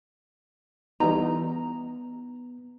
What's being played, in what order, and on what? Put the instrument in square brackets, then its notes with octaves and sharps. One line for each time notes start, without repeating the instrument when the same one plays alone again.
[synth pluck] E3 G3 D#4 [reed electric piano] B3 [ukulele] A#5